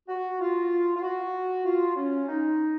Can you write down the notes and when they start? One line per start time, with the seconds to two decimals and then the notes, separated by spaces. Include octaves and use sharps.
0.08 F#4
0.40 F4
0.96 F4
1.02 F#4
1.66 F4
1.96 C#4
2.28 D#4